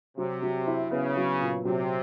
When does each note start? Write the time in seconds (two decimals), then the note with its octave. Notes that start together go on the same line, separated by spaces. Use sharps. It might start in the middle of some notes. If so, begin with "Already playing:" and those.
0.18 C3 F#3
0.42 F#3
0.67 E4
0.91 C#3 B3
1.16 F#3
1.41 A#2
1.65 C3 F#3